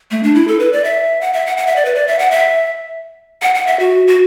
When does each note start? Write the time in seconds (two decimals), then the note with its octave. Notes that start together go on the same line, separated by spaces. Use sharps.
0.11 A3
0.23 D4
0.35 E4
0.48 A4
0.59 B4
0.72 D5
0.84 E5
1.21 F#5
1.33 E5
1.46 F#5
1.57 F#5
1.67 E5
1.76 D5
1.85 B4
1.95 D5
2.07 E5
2.19 F#5
2.31 E5
3.42 F#5
3.55 F#5
3.67 E5
3.79 F#4
4.07 F#4